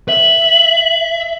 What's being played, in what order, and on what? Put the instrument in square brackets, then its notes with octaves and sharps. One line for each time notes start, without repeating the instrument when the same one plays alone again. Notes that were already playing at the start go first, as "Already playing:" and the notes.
[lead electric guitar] E5 [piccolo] F#7